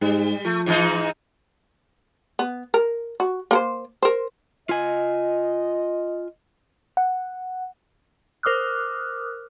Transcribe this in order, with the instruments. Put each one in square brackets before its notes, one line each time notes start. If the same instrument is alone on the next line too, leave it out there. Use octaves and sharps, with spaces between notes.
[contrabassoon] G#2 [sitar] G3
[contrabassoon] F3 [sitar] A3
[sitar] G#2 E3 D#4
[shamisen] B3
A#4
F#4
A#3 A#4 C5
A#4 C5
[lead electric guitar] F4 G#5 [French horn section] D#5
[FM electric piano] F#5
[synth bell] A#4 C5 D6 D#6 F6 F#6